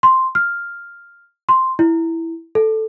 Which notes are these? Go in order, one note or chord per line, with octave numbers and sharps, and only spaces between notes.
C6
F6
C6
E4
A4